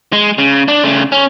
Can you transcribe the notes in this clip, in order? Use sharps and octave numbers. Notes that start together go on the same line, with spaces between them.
G#3
C#3
D4
C#3 A3
C#4